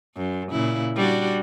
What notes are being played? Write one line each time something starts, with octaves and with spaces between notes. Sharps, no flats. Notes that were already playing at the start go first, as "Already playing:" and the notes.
F#2
A#2 C#3 E4
G3 D4 F#4